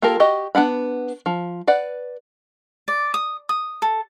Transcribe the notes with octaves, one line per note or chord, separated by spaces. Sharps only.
A#3 F4 G4 A4 A#4
F#4 G4 D#5
B3 D4 F#5 B5
F3
B4 D5 F#5
D5
D#6
D#6
A4